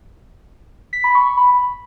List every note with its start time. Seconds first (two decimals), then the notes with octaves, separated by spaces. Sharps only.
0.93 B6
1.04 B5
1.15 C#6
1.26 C#6
1.37 B5